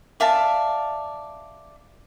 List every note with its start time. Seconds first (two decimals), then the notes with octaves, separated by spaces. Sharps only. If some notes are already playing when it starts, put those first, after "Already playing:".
0.20 D5 E5 F5 A5